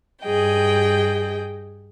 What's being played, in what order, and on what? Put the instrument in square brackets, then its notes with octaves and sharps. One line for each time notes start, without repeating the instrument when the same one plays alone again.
[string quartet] G2 G#4 D#5 G5